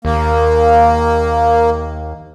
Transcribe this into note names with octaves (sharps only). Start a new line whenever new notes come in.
D#2 A#3